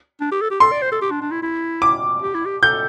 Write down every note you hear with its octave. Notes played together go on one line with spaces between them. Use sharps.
D4
G4
A4
G4
A4 C6
D5
C5
A4
G4
D4
D4
E4
E4
D6
G4
E4
G4
A4 G6